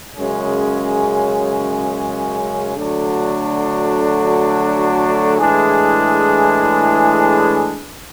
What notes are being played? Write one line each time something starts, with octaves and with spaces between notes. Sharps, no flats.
F#2 C#3 G#3 C#4 G#4
D3 F#3 A3 D4 F#4
A2 E3 G#3 D4 G#4